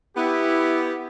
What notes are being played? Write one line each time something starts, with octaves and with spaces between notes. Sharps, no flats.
B3 E4 G4